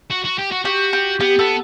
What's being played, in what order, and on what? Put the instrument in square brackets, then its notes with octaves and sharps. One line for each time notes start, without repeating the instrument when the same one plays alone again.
[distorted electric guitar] F#4
F#4
G4
F#4
[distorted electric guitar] F#4 [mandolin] G4
[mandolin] G4
[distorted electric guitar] B3 [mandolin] G4
[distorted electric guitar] B3 [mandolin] A4